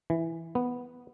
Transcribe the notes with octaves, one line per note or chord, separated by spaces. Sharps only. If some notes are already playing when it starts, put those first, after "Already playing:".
E3
B3